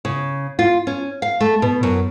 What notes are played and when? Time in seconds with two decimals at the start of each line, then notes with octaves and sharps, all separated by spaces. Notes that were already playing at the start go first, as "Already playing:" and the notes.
0.05 C#3
0.59 F4
0.87 C#4
1.22 F5
1.40 A3
1.62 B2
1.83 F#2